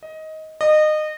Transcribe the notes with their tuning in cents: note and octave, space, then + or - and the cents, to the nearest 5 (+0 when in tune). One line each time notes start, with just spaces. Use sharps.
D#5 +15
D#5 -25